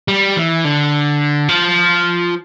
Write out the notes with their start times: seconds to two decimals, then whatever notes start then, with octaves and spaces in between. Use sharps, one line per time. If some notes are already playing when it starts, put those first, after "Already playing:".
0.08 G3
0.37 E3
0.65 D3
1.49 F3